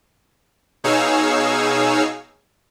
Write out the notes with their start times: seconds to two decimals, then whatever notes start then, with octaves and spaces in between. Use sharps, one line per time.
0.84 B2 D#4 G#4 C#5 F5 E6